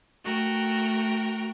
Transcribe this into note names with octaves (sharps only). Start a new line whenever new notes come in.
A3 F#4 A#4 G5